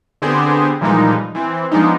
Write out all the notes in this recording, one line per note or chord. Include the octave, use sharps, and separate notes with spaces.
D3 B3 C4 G4 G#4 C5
A#2 E3 F3 G3 G#3 D#4
E3 C4
F3 G#3 B3 D4 D#4